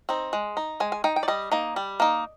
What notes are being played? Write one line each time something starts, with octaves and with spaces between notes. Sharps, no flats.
C4 D#4
G#3
D#4
G#3 G#5
G#5
D#4 G5
G5
D5
G3 D#5
A#3 D#4
G3
A#3 D#4